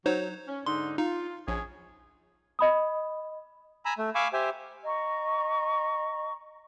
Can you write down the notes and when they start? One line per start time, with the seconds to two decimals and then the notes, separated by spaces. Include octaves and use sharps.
0.06 F#3 D#4 C5 C#5
0.48 C#4
0.66 G#2 D3 D#4 C6
0.98 D#4 F4
1.48 A#1 C#4 G#4 C#5
2.59 D#5 B5 D#6
3.85 G#5 A#5 B5 E6
3.98 A3
4.15 F5 G#5 B5 C#6 D6 E6
4.33 G4 C5 E5 G#5
4.85 D#5 A#5 C#6